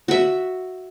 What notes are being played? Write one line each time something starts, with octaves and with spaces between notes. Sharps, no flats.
F#4 E5